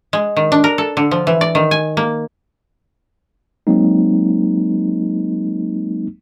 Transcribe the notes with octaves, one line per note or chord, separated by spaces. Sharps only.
G#3
D#3
D4
A#4
A4
D3
F3
E3
D5
D#3
G#5
A#3
F#3 G#3 A#3 C4 D#4